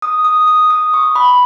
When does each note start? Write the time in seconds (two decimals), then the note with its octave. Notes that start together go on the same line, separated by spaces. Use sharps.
0.02 D#6
0.25 D#6
0.47 D#6
0.70 D#6
0.94 C#6
1.15 B5